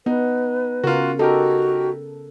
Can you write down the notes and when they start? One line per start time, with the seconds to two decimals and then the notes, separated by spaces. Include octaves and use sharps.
0.06 B3 D#4 B4
0.84 C#3 F4 F#4 A#4
1.19 D#4 F#4 G4 A4 A#4